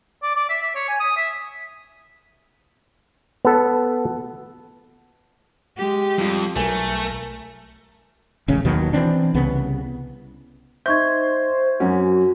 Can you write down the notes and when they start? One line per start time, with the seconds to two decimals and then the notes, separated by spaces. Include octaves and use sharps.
0.23 D5
0.35 D5
0.49 E5
0.62 E5
0.75 C#5
0.88 G#5
1.00 D#6
1.17 E5
3.45 B3 A4
5.77 G#3 G4
6.18 F2 G3 F4
6.56 B1 A3 A#4 G#5
8.48 E1 A1 C#3 C#4
8.65 D#2 B2 D#3 F#3
8.93 E3 C4 D4
9.34 C2 C#3 B3
10.86 D#4 C5 E5 C#6 G6 G#6
11.80 F#2 C#4 F#4